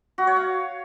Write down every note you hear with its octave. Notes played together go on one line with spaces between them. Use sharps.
F#4
C#5
F5